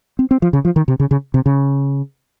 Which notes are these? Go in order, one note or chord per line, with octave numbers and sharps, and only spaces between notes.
C4
C4
F3
C#3
F3
D#3
C3
C#3
C#3
C3
C#3